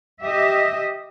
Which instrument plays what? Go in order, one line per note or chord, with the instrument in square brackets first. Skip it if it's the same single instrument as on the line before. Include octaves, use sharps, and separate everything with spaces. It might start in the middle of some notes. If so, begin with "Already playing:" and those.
[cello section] G4 D#5 E5